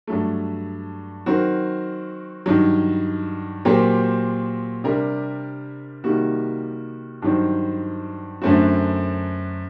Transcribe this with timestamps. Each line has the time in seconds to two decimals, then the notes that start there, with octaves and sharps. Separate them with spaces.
0.07 G2 F#3 A3
1.26 D#3 F#3 C4 F#4 A#4
2.46 G2 D#3 F#3
3.65 A#2 F#3 C4 G4 A#4
4.84 C3 G3 D4 G4 A#4
6.04 C3 D#3 G3 A#3 F#4
7.22 G2 D#3 F#3 C4
8.42 F#2 D3 A3 C4 F#4